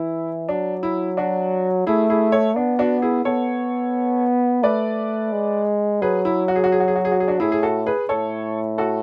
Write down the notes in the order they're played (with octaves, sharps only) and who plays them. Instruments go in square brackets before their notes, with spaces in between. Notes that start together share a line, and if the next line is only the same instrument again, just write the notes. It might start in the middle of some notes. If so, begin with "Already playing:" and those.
Already playing: [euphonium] E3 [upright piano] E4
[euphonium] F#3 [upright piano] D4
[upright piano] E4
D4 F#4
[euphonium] A3 [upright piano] E4 G#4
[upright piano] E4 G#4
A4 C#5
[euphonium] B3 [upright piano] D4
[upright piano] D4 F#4
E4 G#4
[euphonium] B3 [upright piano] A4 C#5
[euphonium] A3 [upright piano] B4 D5
[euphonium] G#3
[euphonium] F#3 [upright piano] G#4 B4
[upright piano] E4
F#4
G#4
F#4
G#4
F#4
G#4
F#4
G#4
F#4
G#4
D4 F#4
[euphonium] A2 [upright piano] E4 G#4
[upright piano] G#4
F#4 A4
G#4 B4
[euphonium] A2 [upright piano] A4 C#5
[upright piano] F#4 A4